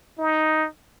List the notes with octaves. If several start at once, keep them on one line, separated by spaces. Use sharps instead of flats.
D#4